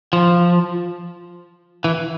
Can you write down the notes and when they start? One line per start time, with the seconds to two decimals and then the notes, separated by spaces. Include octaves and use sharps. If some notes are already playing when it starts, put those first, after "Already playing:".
0.13 F3
1.84 E3